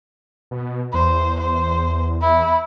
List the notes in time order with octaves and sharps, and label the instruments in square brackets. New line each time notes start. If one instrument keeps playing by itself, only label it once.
[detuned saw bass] B2
[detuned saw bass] E2 [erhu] C5
[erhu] C5
E4